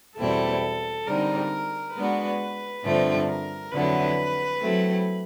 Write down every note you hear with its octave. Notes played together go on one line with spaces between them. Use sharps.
E2 B2 G3 C4 E4 A4
D3 G3 C4 D#4 A#4
G#3 B3 D4 F#4 B4
G2 D3 F3 A3 C4
A#4
F2 D3 F#3 B3 E4 B4
F#3 A3 C4 E4